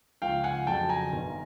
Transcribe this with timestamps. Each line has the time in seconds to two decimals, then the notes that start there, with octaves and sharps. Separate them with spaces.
0.22 C#2 C#3 F3 F5 G5
0.44 F#5 G#5
0.67 F2 C#3 F#3 G5 A5
0.89 G#5 A#5
1.12 G1 G2 D#3